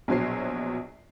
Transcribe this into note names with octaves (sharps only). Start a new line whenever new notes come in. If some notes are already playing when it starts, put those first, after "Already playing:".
A#1 B2 F#3 C5 C#5 C7